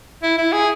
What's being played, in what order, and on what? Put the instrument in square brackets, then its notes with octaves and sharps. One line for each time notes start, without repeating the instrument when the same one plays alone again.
[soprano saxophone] E4
E4
G#4